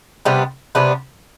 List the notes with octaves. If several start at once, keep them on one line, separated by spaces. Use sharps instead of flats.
C3 G3 B3 D4
C3 G3 B3 D4